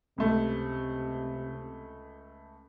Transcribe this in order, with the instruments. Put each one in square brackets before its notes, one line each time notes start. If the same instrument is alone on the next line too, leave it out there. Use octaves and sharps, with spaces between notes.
[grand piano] C#2 A3 [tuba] C3